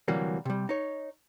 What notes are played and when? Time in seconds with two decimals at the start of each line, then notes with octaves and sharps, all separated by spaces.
0.08 D2 C3 E3 F#3 G3 A#3
0.45 C3 G3
0.69 D#4 C#5